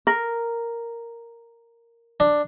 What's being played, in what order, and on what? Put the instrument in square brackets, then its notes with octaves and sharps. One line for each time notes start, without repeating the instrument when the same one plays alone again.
[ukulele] A#4
[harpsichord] D4